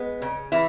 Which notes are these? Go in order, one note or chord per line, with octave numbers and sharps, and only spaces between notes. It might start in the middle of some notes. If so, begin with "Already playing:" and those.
Already playing: G#3 B3
C#3
E3 E4